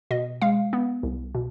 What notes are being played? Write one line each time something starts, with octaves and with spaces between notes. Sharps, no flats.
B2 D#5
G#3 F5
B3
C2
B2